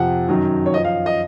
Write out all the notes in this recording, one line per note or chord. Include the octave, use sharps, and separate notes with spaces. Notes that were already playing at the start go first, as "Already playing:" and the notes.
Already playing: F2 C3 F3 F#5
F#2 D#3 F#3
C#5
F#2 F3 D#5
F5
D#5